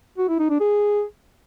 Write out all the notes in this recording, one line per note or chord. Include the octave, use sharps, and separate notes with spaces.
F#4
E4
D#4
D4
G#4